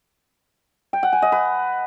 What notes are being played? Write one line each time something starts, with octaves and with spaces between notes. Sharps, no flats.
G5
F#5
G#5
D#5
B4